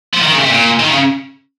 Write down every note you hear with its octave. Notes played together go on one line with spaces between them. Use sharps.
F3
D#3
C#3
C3
A#2
D#3
C#3